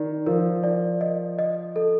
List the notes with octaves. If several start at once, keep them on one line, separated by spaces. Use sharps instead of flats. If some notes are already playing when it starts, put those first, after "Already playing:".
Already playing: D#3 D5
F3 A#4
D5
D#5
D#5
A4